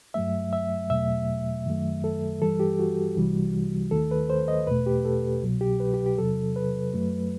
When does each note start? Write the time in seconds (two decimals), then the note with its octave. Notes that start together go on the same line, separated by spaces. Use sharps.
0.14 G2 F#3 A3 E5
0.53 E5
0.90 E2 B2 F#3 A3 E5
1.66 F#2 D#3 F#3 A3
2.04 A4
2.41 G2 E3 G3 A4
2.60 G4
2.79 F#4
3.17 C2 C3 E3 G3
3.91 D#2 D#3 A3 A4
4.11 B4
4.30 C5
4.48 D#5
4.67 E2 B2 A3 B4
4.86 G4
5.05 A4
5.42 C2 B2 F#3
5.61 G4
5.80 B4
5.94 G4
6.06 G4
6.18 E2 C3 F#3 A4
6.56 B4
6.93 F#2 F#3 A3